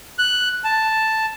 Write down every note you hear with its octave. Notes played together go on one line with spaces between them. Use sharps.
F#6
A5